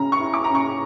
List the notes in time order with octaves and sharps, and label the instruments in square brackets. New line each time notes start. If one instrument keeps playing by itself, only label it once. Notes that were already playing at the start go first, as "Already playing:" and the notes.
Already playing: [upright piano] C#3 C#4 A#5
C#6
E4
D6
C#4 A#5
C#6